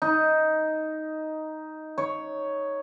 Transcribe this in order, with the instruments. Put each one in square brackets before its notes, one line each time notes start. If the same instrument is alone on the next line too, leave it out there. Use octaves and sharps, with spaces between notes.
[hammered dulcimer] D#4
C#5